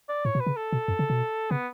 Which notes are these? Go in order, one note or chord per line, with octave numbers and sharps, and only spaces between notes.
D5
A2 C#5
B2
B4
C#3
A4
B2
F#2
C#3
B2
C#3 B3